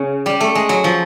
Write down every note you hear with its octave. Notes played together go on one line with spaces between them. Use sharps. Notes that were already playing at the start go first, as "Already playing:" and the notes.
Already playing: C#3
G3
A3
G#3
F#3
F3